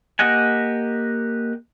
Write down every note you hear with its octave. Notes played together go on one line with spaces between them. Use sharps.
A#3 G4 D#5 F#5 G#5